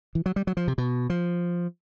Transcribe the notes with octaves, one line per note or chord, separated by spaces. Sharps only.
E3
F#3
G3
F#3
F3
C3
B2
F3